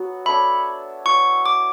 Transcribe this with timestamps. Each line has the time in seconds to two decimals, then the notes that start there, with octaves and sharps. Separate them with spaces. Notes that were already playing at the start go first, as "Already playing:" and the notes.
Already playing: F#3 B3 F#4
0.26 D4 A4 C#5 E5 B5
1.05 F#3 B3 E4 C#6
1.46 D6